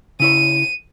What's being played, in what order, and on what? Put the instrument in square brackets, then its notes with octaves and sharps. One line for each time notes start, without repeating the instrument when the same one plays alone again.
[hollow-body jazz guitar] C#3 E4 C#5 [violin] D#7